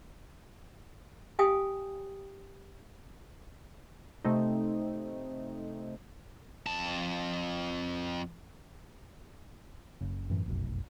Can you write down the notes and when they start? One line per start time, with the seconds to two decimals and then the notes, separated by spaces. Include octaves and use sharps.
1.39 G4 F5 G5 G#5 D#6
4.25 C3 A3 C4 D#4
6.66 F2 A5
10.01 F#1 C#3
10.30 F#2 A2 E3
10.46 F1 B1 F#2